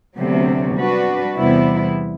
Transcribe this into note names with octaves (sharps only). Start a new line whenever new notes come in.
D2 C3 F#3 B3
G3 D4 F#4 B4
E2 C3 G3 B3 E4